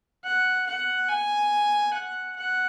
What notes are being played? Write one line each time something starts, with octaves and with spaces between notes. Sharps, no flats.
F#5
F#5
G#5
F#5
F#5